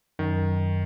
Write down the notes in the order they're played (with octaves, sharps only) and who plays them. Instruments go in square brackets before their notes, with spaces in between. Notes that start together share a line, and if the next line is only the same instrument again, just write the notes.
[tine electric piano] F#2 [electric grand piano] D#3